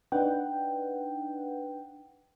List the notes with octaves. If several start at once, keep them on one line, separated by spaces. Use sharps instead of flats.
D4 D#4 B4 F#5 G5